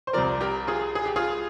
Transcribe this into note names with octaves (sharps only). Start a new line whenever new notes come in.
C5
C2 C3 F3 A#4 D5
G4 A#4
F4 G#4
G#4
G4
F4 G#4